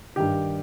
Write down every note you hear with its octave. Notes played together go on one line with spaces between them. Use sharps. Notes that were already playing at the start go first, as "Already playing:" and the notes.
G2 D#3 G4